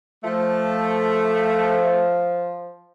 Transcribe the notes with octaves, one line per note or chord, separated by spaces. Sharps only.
F3 A3